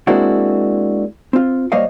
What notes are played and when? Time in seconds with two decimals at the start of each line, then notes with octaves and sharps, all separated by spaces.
0.07 G#3 A#3 C4 D4 E4 F#4
1.33 C4 F4
1.72 G3 A#3 C5 C#5 D#5 F5